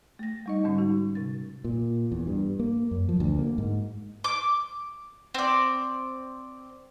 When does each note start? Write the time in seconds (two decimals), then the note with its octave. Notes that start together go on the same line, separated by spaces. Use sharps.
0.19 A3 A#6
0.46 G3 D#4 D#5
0.64 G#2 D3 G3 C#4
0.78 G#3 D#4 F#4
1.15 C3 A6
1.65 A#2
2.12 E2
2.27 G2
2.59 A#3
2.91 F#2
3.09 F3
3.20 D2
3.39 A#3
3.58 G#2
4.24 D6
5.34 C4 D5